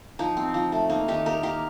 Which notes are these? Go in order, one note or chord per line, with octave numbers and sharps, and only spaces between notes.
F3 D#4
C4
F3
A3
A#3 D#4
D#3 D#4 G4
A#3 G4 A#4
A#3 G4 A#4